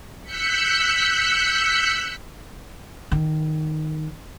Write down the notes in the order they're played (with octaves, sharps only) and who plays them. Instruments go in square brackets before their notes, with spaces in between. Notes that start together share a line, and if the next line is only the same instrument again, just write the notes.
[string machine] E6 F#6 G6 B6 C#7
[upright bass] D#3